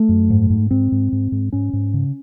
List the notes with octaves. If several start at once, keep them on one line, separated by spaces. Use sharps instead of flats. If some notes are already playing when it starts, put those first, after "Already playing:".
Already playing: A3
F#2
G#2
G#2
G#2 C4
G#2
G#2
G#2
G#2 C#4
G#2
C#3